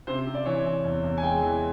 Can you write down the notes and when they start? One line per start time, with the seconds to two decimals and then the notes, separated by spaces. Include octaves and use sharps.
0.07 C3 C5
0.26 C3
0.35 D5
0.45 E3 C#5
0.65 E3
0.84 E2
1.04 E2
1.18 G#5
1.23 G#3 G5
1.42 E3